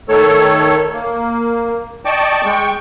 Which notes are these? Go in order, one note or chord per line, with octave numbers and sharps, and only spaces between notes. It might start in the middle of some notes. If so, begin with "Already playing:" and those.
D#3 A3 A4 C#5
A#3
D5 D#5 G5 A5 C#6 D6
G#3 G5 C#6